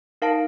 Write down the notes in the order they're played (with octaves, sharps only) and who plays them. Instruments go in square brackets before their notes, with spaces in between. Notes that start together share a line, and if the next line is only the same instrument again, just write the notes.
[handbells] D#4 A#4 F5 A5